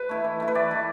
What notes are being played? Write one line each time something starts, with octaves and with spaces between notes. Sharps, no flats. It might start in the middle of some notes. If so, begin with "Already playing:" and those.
Already playing: B4
A3 E4
E3
A3 E4
B4
E3 D5
A3 E4